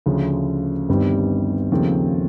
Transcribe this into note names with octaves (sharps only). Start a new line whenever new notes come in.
D2 C#3 F3
G1 G2 D#3 G3 C4
D#2 C#3 F3 A3 C4